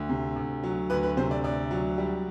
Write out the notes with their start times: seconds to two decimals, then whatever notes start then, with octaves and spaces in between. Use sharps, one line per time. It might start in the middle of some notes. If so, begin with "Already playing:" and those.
Already playing: D2
0.09 C3
0.36 D2
0.64 F#3
0.90 D2 B4
1.03 B4
1.17 C3 C5
1.31 D5
1.44 D2 D5
1.71 F#3
1.98 G3